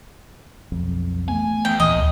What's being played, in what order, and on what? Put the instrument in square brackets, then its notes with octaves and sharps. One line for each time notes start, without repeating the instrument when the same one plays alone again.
[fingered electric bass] B1 F2
[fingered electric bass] E3 A3 B3 [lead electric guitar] G#5
[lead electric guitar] E2 [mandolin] G5
[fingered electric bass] D#2 A#2 [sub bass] E3 [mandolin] D#5
[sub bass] D2